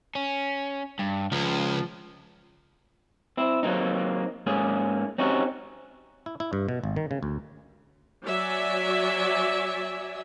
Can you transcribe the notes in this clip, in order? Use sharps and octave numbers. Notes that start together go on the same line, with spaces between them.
C#4
G2
C#2 F3
C4 E4
F#3 A#3 C4 D#4
G#2 A#3 C#4 G#4
C4 C#4 D#4 F#4 G4
E4
E4
G2
B2
G#1
D#3
C#3
D2
F#3 D5 E5 G#5